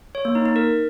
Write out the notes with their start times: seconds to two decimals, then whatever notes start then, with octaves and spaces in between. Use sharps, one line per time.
0.15 C#5
0.25 A#3
0.35 D#4
0.45 D#4
0.56 A#4